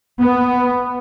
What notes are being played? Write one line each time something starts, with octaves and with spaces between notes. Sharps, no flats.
B3